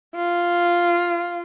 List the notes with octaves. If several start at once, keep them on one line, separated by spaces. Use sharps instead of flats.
F4